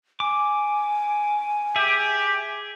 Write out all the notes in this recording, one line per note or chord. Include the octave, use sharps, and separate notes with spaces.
G#5 D6
G4 G#4 E5